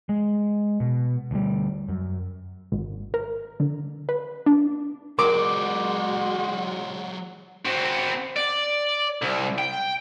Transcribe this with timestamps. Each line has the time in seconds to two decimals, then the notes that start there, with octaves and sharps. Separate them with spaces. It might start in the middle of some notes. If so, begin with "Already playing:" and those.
0.09 G#3
0.80 B2
1.31 D2 F3 G3
1.89 F#2
2.72 G#1
3.14 A#4
3.60 D3
4.09 B4
4.46 D4
5.19 F#3 G#3 F#4 G4 A#4 D6
7.65 C4 F#4
8.37 D5
9.22 C2
9.58 G5